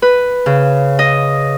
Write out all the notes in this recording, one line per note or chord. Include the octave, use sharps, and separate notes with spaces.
B4
C#3
D#5